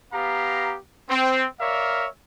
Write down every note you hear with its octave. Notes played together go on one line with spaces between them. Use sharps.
B3 G4 F5 A#5
C4
A#4 C#5 D5 E5 F5